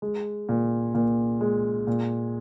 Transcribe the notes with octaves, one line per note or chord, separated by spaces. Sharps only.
G#3
A#2
A#2
G#3
A#2